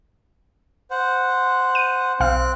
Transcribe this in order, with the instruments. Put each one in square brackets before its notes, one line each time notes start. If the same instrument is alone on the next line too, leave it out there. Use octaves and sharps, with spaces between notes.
[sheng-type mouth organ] C5 F#5
[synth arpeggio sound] D#7
[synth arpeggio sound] B1 F5 [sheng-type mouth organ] C4 F#6